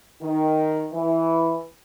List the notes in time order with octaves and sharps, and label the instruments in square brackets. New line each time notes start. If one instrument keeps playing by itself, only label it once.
[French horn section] D#3
E3